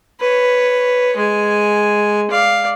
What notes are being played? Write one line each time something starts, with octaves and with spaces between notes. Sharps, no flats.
B4 C#5
G#3 G#5
D5 F5